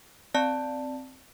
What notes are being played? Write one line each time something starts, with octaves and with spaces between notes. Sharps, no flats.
C4 D5 A5